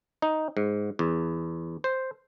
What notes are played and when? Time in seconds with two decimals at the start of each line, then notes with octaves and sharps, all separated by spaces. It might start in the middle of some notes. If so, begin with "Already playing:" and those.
0.22 D#4
0.57 G#2
0.99 E2
1.84 C5